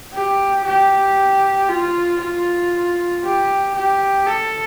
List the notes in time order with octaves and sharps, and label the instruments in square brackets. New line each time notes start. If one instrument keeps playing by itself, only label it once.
[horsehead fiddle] G4
G4
F4
F4
G4
G4
A4